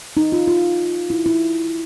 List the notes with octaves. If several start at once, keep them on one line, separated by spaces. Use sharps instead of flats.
D#4
F4
F4
E4
E4